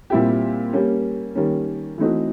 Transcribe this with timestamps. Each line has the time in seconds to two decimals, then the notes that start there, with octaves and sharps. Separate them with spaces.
0.10 A#2 G3 C4 E4 G4
0.73 G3 A#3 C#4
1.35 D#3 G3 A#3 C#4
1.98 E3 A3 C4 D#4 F#4